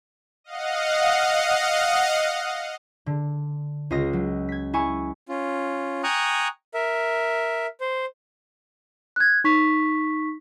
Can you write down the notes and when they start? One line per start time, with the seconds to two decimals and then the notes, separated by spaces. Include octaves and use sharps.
0.44 D#5 F5 F#5
3.06 D3
3.90 C#2 F4 D#5 A#6
4.13 F#3
4.49 G#6 B6
4.73 E4 G#5 C#6
5.29 C#4 F4
6.03 G5 G#5 A#5 C#6 D#6 F#6
6.74 A#4 E5
7.81 C5
9.16 F#6 G#6
9.44 D#4 C#6 B6